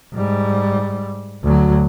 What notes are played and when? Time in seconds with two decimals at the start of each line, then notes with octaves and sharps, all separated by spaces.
0.14 G#2 G3
1.44 D2 F#3